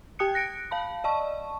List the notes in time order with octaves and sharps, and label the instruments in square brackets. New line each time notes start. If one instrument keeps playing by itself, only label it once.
[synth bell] G4 G5 D#6 F#6 C#7
F#6 A#6 C#7 D7
F5 A5 B5
D5 D#5 A5 C#6